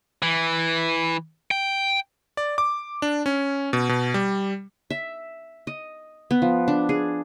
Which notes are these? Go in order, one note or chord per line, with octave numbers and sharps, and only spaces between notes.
E3
G5
D5
D6
D4
C#4
B2
B2
G3
E5
D#5
B3
F3
D4
G#4